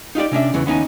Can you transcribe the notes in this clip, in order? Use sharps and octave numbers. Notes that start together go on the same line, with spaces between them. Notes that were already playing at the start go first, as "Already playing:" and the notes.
D#4 F4 G4 D5
C3 C#4 D4 E5
E2 C#3 E3
D#2 B3 C#4 D#4 G#5